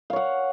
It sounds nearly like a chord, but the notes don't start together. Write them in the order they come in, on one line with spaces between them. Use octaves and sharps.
F5 C#5 F#5